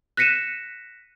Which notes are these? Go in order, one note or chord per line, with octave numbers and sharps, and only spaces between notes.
F#6 A#6 B6 C#7 D#7 E7